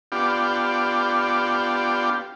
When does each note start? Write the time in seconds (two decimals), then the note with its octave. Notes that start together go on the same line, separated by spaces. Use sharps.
0.12 B3 D4 F4 G4